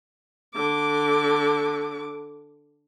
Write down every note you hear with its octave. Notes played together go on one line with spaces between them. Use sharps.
D3 D6